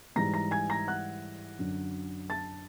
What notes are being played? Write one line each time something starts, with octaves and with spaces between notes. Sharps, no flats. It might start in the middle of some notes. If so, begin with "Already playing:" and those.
G#2 E3 G3 A#5 A#6
A#5 A#6
G#5 G#6
A#5 A#6
F#5 F#6
F#2 D3 F#3
A5 A6